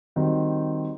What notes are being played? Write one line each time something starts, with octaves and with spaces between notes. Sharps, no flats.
D#3 G3 C4 D#4 F#4